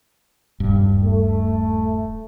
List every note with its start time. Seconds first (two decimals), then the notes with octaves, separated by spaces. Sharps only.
0.60 D#1 G2
1.04 A3